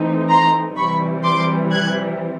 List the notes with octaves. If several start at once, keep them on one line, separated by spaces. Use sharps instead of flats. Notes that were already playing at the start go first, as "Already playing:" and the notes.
Already playing: E3 A3 C4 D#4
A#5 C6
C3 E3 G3 B5 C#6
C6 D6
F#6 G#6